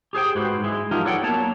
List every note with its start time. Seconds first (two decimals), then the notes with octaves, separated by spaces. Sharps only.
0.13 G4 G#4 C5 G5
0.35 G#2 F#4 B4 C5
0.64 G#3 E4
0.91 F3 F#3 D#4 F4 G4 A#4
1.05 A4 B4 C#5 D5 F#5 G5
1.23 F#3 A#3 B3 C#5 A5